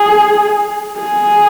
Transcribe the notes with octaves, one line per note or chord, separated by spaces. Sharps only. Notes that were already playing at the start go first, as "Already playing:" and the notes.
Already playing: G#4
G#4